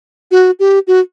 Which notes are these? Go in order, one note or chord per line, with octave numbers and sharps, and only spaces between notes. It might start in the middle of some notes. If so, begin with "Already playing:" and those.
F#4
G4
F#4